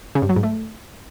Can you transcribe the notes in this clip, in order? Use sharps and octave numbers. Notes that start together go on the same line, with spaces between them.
C#3
G2
F#3
G#2
A3